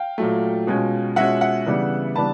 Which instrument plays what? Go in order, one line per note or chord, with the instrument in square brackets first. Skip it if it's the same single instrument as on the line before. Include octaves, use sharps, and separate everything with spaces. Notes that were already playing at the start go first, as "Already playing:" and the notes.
Already playing: [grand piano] F5 G5
A#2 F#3 A3
B2 G#3 C#4 F4
B2 G#3 C#4 F4 E5 F#5
E5 F#5
C#3 E3 G3 B3 D4
C#3 E3 G3 B3 D4 A5 B5